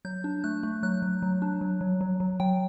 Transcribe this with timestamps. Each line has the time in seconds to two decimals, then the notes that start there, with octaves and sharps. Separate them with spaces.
0.05 F#3 G6
0.24 D4
0.44 A3 F#6
0.63 A3
0.83 F#3 F#6
1.02 F#3
1.22 F#3
1.42 D4
1.61 F#3
1.81 F#3
2.01 F#3
2.20 F#3
2.40 F#3 G5